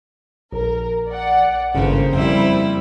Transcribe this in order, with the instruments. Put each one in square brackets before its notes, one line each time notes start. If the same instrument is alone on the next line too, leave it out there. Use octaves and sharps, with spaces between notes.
[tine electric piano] A#1 [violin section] A#4
[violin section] D5 F#5
[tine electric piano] G#1 G2 [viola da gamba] C#3 [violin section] A#3 C5
[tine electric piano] F2 [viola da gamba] G3 E4